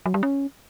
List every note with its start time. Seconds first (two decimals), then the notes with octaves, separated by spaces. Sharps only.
0.06 F#3
0.14 G3
0.23 C#4